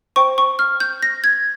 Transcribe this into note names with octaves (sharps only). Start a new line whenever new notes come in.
C5 G5 C#6
C#6
F6
G6
A#6
G#6